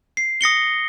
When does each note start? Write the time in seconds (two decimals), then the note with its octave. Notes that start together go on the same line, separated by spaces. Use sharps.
0.17 C7
0.41 D#6 A#6 C#7 G7